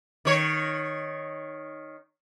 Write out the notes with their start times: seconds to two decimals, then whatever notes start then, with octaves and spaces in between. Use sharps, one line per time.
0.25 D#3 C#5